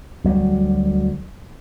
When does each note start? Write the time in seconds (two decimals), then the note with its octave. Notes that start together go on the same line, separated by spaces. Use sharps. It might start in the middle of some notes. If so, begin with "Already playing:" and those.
0.24 D2 F#3 G3